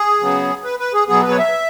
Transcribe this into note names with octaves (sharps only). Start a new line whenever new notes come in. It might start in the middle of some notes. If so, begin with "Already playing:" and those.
Already playing: G#4
C#3 F#3 B3
B4
B4
G#4
B2 F#3 B3 G#4
B4
C#5
E5